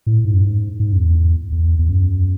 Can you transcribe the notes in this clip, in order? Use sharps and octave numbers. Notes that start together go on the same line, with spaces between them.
A2
G#2
F#2
G#2
G#2
F#2
E2
E2
E2
F#2